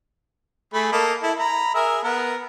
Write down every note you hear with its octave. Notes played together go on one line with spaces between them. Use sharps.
A3 G#4 B5
A#3 A4 D#5
E4 A4
A#5 B5
G#4 A#4 E5
B3 A#4